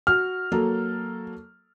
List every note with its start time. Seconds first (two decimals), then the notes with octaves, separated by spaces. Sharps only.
0.07 F#4 F6
0.52 F#3 A#3 A4